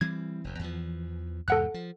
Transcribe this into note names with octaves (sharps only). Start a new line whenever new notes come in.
E3 G3 C4 G#6
F1 D#2
E2 E3 F3
E2 G#2 C3 A4 F#5 F#6
F3